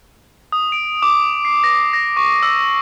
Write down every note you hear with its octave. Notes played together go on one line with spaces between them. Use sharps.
D#6
D7
D6
C7
A#6
A#6
C#6
E6